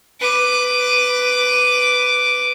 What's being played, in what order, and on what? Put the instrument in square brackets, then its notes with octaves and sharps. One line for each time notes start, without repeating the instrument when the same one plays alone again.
[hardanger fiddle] B4 D6